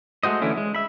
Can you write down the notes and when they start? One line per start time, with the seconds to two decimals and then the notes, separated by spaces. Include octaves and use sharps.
0.23 G#3 A3 F#4 C5 D#5
0.42 D3 E3 A3 C#4 E4
0.58 G#3
0.75 E5 B5